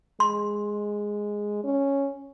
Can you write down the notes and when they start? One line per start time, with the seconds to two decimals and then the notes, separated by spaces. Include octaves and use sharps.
0.20 G#3 C6
1.64 C#4